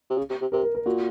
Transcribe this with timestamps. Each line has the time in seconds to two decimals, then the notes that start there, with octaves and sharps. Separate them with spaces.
0.10 C3
0.18 C#3
0.30 C3
0.41 C3
0.52 C3 A#4
0.63 A#4
0.75 A#4
0.85 A#2 F#4